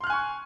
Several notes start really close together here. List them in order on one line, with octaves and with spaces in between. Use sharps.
C6 F6 F#6 G#5 C#6